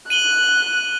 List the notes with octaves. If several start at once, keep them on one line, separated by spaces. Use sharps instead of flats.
F#6 D#7 F#7 G7